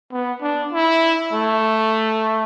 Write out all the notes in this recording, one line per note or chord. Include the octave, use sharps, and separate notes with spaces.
B3
D4
E4
A3